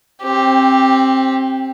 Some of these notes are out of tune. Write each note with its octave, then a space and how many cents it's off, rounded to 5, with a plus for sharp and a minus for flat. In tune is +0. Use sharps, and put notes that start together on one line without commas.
C4 +20 G4 +0